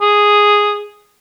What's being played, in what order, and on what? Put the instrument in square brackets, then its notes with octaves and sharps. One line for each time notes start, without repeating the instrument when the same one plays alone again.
[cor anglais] G#4